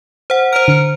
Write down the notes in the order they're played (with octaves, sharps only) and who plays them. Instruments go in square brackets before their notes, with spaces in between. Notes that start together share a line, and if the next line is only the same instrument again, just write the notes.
[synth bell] C5 F#5
[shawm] A#4 [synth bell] C5 F6
[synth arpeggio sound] D3 C#7